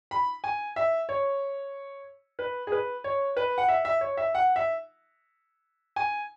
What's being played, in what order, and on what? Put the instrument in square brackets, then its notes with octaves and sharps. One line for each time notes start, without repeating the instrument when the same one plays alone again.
[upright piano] B5
G#5
E5
C#5
B4
G#4
B4
C#5
B4
F#5
E5
E5
C#5
E5
F#5
E5
G#5